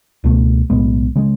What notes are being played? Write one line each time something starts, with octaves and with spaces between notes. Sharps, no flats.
C#2 B2 A3
B1 A2 G#3 B3
C#3 G#3